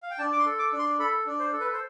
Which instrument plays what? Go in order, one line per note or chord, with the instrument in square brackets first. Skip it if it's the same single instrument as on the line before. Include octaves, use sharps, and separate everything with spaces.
[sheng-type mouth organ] F5
G5
D4 A5
D6
C6
A4
D6
D4
C6
A4 B5
D4
C5
A4
B4
C5